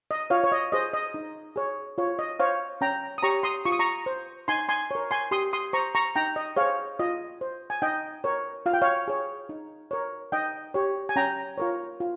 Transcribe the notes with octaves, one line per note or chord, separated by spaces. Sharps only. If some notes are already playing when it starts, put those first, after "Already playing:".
D#5
F4 C#5 F5
C#5
D#5
G#4 C5 D#5
D#5
D#4
G#4 C#5
F4 C#5
D#5
C5 C#5 F5
C#4 G5 A#5
D#6
G4 C#5 A#5 C#6
C6 D#6
F4 C#6
D#6
A#5 C#6
C5
D#4 G#5 C6
G#5 C6
A#4 C#5
G#5 C6
G4 C6 D#6
C6 D#6
C5 A#5 C#6
A#5 C#6
D#4 G5 A#5
D#5
G#4 C5 C#5 F5
F4 D#5
C5
G#5
D#4 D#5 G5
A#4 C#5
F4 F5
G5
C#5 F5
G#4 C#5
D#4
A#4 C#5
D#4 D#5 G5
G4 C#5
G#5
C#4 G5 A#5
F4 A#4 C#5
F4